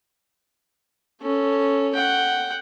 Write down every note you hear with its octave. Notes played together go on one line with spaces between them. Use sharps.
C#4 A4
F#5 G5